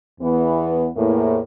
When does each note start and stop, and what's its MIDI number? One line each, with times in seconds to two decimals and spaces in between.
0.21 0.87 40
0.21 0.87 52
0.21 0.87 59
0.96 1.39 40
0.96 1.39 45
0.96 1.39 58